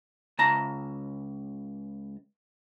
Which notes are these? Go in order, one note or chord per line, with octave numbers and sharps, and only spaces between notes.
C#2 A5 A#5